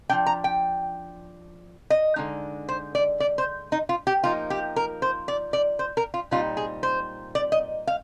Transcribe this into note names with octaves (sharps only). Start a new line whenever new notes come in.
F3 A#3 D4 G5
A#5
G5
D#5
D3 G#3 D#4
C5
D5
D5
C5
D#4
F4
G4
F3 A#3 D#4 F4
G4
A#4
C5
D5
D5
C5
A#4
F4
A#2 G3 C4 D#4 F4
G#4
C5
D5
D#5
F5